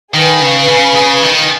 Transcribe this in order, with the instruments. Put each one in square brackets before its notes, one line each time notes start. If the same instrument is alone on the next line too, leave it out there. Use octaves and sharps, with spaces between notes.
[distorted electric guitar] D#3 [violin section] G#4 B4 F5 G#5
[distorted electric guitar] C#3
C#3
C#3
D#3